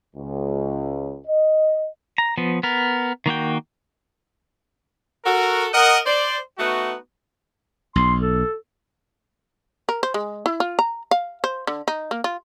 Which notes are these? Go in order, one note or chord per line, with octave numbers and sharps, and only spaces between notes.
C#2
D#5
A#5
F3 B3
B3 A#4
D#3 A#3 F#4 G5
F#4 A4 A#4
A#4 D#5 F#5
C5 D5
A3 B3 D#4 F#4
B1 C6
A4
A#4
C5
G#3
E4
F4
A#5
F5
C5
D3
D#4
A#3
F4